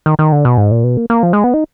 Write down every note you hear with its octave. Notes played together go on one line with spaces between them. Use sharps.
D#3
D#3
D3
B2
G#2
A#2
B2
A#3
A#3
F3
G#3
B3
D#4